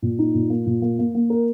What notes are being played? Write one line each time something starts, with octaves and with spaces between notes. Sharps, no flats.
A#2
D#4
A#2
A#3
A#2
A#3
A#3
A#3
A#4